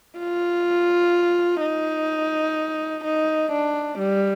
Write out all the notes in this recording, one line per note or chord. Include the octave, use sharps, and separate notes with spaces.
F4
D#4
D#4
D4
G3